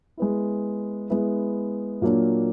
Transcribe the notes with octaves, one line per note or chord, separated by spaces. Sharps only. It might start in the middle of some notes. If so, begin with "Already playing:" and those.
G#3 B3 E4
G#3 B3 E4
A#2 F#3 A#3 D4